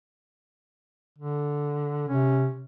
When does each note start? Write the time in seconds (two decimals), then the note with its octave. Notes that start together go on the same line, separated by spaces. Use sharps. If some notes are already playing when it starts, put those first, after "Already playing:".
1.18 D3
2.08 C3 C#4